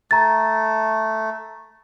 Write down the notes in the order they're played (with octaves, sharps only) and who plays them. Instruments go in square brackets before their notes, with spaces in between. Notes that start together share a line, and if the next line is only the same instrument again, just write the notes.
[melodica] A3 [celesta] A#5 A6